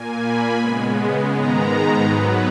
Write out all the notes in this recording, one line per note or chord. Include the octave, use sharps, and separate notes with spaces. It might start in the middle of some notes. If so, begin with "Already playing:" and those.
Already playing: A#2 A#3 G#5
B5
C#3 G#3 B3
G#2 D#3 G#3 B3 A#5
G#2 F#3 B3 B4